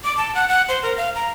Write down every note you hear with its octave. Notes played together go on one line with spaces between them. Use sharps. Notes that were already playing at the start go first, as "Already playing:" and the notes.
D6
A5
F#5
F#5
C5
A#4
F5
A#5